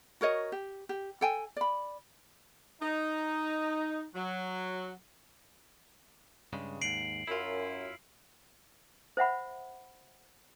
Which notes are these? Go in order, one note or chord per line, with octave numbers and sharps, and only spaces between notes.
F#4 A#4 C#5 D#5
G4
G4
A4 G5 G#5
D5 B5
D#4
F#3
G2 C#3 G#3
D#2 G#2 C7 D7 F#7
F#2 E4 F4
C5 E5 F#5 B5